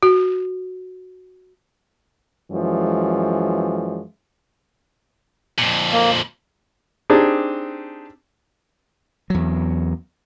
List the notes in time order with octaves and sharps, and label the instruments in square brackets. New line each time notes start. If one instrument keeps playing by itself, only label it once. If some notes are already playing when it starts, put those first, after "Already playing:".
[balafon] F#4
[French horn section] F#2 E3 F3 G#3
[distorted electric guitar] F2 A#2
[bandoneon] A#3
[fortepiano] C4 D4 D#4 G4 G#4
[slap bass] E2 F#3